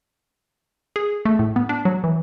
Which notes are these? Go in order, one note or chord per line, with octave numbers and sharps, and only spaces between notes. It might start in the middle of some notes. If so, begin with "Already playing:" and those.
G#4
A3
A2
B3
D4
F#3
E3